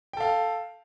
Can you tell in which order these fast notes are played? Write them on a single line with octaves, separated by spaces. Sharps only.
G5 A4 F5